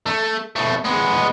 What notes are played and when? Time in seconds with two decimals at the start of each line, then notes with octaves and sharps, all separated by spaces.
0.07 A3
0.56 B2 A3
0.84 G#3 B3